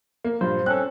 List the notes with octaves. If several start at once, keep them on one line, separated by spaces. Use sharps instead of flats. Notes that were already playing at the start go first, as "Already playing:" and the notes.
A#3
G2 A#2 C5
C4 C#4 A4 F#6